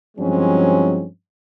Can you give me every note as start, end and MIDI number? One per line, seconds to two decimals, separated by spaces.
0.18 1.05 43
0.18 1.05 53
0.18 1.05 54
0.18 1.05 56
0.18 1.05 60
0.18 1.05 61